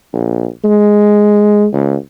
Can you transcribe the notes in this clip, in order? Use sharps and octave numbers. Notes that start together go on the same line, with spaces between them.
A#1
G#3
C#2